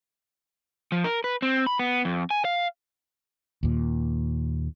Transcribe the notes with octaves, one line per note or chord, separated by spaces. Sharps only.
F3
A#4
B4
C4
B5
B3
F2
G#5
F5
D#2 A#2